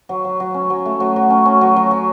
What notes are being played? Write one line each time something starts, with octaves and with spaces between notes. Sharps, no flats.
F#3
F#3
F#3
C#4
F#3
A3
F#3
F#3
C#4
C#4
F#3
F#3
F#3